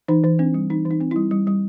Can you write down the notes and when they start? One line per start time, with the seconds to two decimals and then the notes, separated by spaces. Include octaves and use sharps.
0.08 E3 D#4
0.24 E3
0.39 C4 D4
0.54 G3
0.70 E3 D#4
0.85 E3
0.91 D#4
1.01 C4
1.11 G3 E4
1.31 G3
1.47 G3